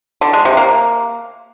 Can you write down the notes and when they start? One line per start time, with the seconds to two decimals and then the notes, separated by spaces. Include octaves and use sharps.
0.21 D3
0.33 G#3
0.45 C3
0.57 A#3